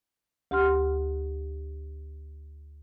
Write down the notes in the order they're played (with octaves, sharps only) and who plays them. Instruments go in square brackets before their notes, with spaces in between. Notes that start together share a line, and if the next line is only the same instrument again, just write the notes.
[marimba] D2 G4 F#5 C6 F6